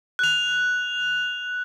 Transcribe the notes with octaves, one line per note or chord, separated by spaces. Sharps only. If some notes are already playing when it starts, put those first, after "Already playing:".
F#6 F7